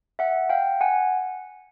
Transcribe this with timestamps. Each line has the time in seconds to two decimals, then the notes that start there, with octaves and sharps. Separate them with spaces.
0.19 E5 F#5
0.50 F5 G5
0.81 F#5 G#5